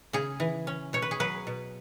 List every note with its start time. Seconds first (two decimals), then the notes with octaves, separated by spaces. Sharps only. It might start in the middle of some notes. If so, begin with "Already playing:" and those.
0.13 C#3 G#4
0.40 E3
0.67 C#4
0.93 B2 C#5
1.02 B4
1.11 G#4
1.20 F#3 B4
1.47 B2